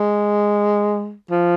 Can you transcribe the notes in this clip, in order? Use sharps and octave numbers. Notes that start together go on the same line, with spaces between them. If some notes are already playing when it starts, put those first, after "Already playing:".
Already playing: G#3
F3